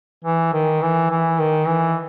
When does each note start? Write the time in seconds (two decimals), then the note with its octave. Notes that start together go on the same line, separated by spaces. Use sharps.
0.25 E3
0.53 D#3
0.82 E3
1.11 E3
1.39 D#3
1.67 E3